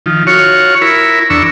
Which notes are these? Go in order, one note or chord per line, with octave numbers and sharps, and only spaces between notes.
D#3 F3
F4 F#4 C#5 C#6
E4 A#4 B5
E2 D4 A#5 C#6 E6